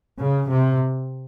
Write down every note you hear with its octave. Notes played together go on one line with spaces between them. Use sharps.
C#3
C3